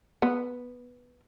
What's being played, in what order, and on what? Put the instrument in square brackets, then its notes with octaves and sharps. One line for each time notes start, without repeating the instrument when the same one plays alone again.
[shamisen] B3